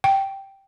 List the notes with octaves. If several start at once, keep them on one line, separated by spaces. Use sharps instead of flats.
G5